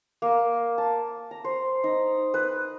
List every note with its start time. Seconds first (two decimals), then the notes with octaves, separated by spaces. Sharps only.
0.22 A#3
0.78 A5
1.31 A#5
1.44 C5
1.84 D#4
2.34 B4